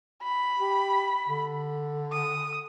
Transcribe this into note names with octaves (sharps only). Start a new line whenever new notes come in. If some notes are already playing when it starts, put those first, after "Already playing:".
B5
G4
D3
D#6